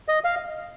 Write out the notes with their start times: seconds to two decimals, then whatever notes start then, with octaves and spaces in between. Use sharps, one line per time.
0.08 D#5
0.24 F5